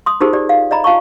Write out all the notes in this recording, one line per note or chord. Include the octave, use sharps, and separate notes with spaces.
C6 D#6
D#4 F4 G4 G#4 A#4 C5
G4 D5
F5
D5 D#5 A#5 B5
F4 F5 A5 C#6